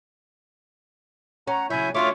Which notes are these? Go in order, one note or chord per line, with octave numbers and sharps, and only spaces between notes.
C#4 F#5 A#5
C#3 F#3 E4 E5 G#5 G6
D3 F#3 A3 C#4 F4 C#5 E5 D6